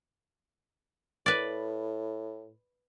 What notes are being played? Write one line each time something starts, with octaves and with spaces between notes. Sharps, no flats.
A2 B4 D5